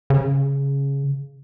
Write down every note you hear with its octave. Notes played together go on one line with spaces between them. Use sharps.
C#3